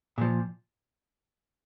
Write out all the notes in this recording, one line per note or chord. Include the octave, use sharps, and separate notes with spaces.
A#2 F3